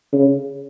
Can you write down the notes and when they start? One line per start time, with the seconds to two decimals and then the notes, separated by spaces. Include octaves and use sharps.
0.13 C#3